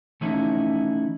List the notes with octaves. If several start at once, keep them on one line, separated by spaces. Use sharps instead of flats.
E3 F3 A3 C#4 D#4 E4